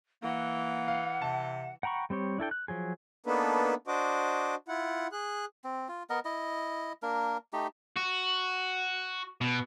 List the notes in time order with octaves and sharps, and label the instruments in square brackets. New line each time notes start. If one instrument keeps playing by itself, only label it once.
[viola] E3 [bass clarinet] A#3 [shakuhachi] F#5
[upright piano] F5
[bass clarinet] C3 [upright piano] A5
[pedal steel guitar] F#5 G5 A#5 B5 C#6
G3 C4 G4 C#5
D4 E4 A4 G5
F#6
F3 F#3 G#4
[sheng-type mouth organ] A#3 B3 D4 D#4 A4 B4
D4 F#4 C5 D#5 D6
E4 F4 F#5
G#4 F#6
[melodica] C4
F4
B3 A#4 D#5
E4 D#5
A#3 D4 A#4
A3 D#4 G4
[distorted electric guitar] F#4
B2